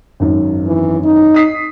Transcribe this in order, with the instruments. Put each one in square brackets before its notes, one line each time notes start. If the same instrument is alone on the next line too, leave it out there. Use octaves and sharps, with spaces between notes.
[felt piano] G#1 F#2 D#3
[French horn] E3
D#4
[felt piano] D#6 B6 C7